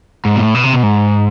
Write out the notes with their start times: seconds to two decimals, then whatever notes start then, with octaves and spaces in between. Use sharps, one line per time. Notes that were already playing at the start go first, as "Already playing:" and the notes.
0.25 G#2
0.36 B2
0.40 A2
0.55 B2
0.64 C3
0.74 B2
0.83 G#2